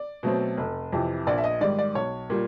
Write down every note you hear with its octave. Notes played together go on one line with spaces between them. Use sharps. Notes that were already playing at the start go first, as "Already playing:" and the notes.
Already playing: D5
B2 F#3 A3 C4
F1
F2 C3 E3
A#1 D5
E5
D#5
G#2 D#3 G3 D5
D5
B1 C#5
A#2 G3